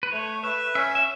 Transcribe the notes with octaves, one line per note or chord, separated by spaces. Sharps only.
B4
A3 C#5
B4 E5
C#4 E5
E5